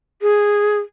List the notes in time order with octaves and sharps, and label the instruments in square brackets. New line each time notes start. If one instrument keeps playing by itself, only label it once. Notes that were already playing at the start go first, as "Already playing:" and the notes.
[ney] G#4